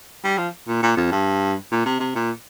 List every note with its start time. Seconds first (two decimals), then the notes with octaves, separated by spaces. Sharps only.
0.24 G3
0.38 F3
0.68 A#2
0.83 A#2
0.97 F2
1.12 G2
1.72 A#2
1.86 C3
2.00 C3
2.15 A#2